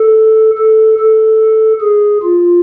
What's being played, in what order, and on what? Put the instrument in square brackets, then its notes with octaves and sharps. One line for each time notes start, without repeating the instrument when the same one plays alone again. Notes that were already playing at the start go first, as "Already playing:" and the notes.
Already playing: [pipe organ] A4
A4
A4
G#4
F4